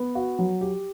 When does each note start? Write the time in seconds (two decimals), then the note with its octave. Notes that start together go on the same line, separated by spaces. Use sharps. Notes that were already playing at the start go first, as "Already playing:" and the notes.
Already playing: B3
0.15 F#4
0.39 F#3
0.61 G4